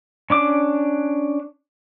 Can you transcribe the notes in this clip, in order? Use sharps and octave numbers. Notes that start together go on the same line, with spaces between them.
C#4 D4 D6